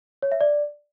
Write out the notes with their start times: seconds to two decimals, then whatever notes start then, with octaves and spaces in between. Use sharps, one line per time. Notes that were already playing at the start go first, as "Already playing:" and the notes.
0.22 C#5
0.32 E5
0.41 D5